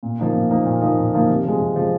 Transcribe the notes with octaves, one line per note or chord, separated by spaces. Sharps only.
A#2
F3 A#3 D#4
A#2
F3 A#3 D#4
A#2
F3 A#3 D#4
A#2
F3 A#3 D#4
C3
F3 G#3
C3
F3 G#3